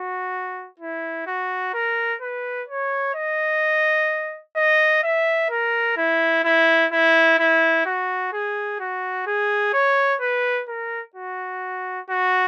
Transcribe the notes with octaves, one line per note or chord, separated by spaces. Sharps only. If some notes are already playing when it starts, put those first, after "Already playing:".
Already playing: F#4
E4
F#4
A#4
B4
C#5
D#5
D#5
E5
A#4
E4
E4
E4
E4
F#4
G#4
F#4
G#4
C#5
B4
A#4
F#4
F#4